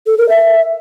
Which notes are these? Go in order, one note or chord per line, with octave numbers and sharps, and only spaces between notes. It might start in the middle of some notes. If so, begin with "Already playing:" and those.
A4
A#4
E5